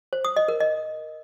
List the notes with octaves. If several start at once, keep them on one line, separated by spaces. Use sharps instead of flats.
C5
D#6
D#5
A#4
D#5